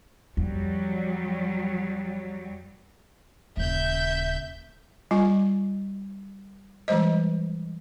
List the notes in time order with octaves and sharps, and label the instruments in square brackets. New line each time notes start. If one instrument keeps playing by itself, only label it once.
[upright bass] F2 [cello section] F#3 G3
[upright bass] D#1 C#3 [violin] E5 G6
[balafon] G3 F4 G#5
E3 G3 G#3 C5 D#5